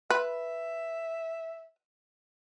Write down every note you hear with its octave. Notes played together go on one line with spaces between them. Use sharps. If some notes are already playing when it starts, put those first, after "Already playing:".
B4 E5